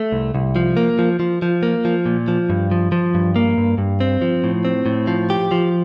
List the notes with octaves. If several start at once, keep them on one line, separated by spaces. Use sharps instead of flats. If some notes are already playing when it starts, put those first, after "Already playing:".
Already playing: A3
C2
C2
F3
A#3
F3
F3
F3
A#3
F3
A#2
F3
G2
F3
F3
G2
A#3
G2
G2
C4
F3
A2
C4
A2
F3
G4
F3